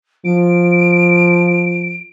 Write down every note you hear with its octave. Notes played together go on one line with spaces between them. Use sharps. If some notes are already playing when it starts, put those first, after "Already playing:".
F3 D7